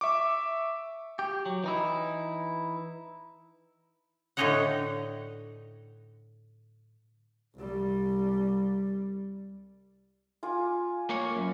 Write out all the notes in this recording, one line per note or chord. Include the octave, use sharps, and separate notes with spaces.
E5 C#6 D6
G4
F#3
E3 D#4 E4
A2 D3 D#4 C#5 D#5 F#5
C2 G3
F4 G#5 D6
A#3 C#5
F#2